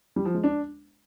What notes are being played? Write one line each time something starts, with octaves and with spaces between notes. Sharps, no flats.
G3
F3
G#3
D4